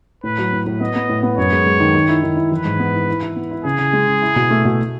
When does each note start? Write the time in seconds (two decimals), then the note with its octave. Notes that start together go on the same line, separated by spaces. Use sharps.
0.24 A2 B4
0.38 F#3
0.53 A2
0.66 A2
0.81 B3 D#5
0.96 B3
1.09 A2
1.23 B3
1.38 F#2 C#5
1.52 G#3
1.66 G#3
1.80 D#3
1.95 D#3
2.08 E4
2.23 D#3
2.37 E4
2.52 E3 B4
2.65 G#2
2.80 B3
2.93 E4
3.09 E4
3.22 E4
3.36 B3
3.51 E4
3.65 C#3 G#4
3.79 C#3
3.93 G#3
4.07 C#3
4.22 E4
4.36 B2
4.51 A3
4.65 B2